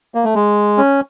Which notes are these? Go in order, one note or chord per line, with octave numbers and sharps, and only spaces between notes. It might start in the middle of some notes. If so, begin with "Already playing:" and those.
A#3
A3
G#3
C#4